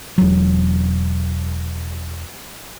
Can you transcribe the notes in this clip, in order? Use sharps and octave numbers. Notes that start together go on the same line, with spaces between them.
E1 F#3